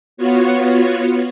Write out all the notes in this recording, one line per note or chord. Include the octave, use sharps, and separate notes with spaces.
B3 F4 F#4 C#5